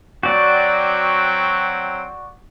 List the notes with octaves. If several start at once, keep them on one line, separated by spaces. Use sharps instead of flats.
F#3 C4 F#4 D5 G5